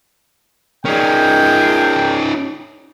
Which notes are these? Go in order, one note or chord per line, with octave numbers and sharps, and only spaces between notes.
C#4 D#4 G#4 A#4 G5